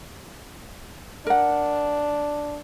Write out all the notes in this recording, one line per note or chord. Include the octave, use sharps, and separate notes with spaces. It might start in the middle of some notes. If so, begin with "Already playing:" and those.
D4 A#4 F#5